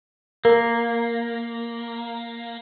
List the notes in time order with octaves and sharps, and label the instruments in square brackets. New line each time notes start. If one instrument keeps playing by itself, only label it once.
[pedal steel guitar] A#3 [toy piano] A#4